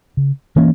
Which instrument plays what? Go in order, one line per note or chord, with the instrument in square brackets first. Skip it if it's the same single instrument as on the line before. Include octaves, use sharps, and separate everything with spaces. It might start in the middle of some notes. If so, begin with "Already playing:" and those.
[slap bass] C#3
E3 A#3 C#4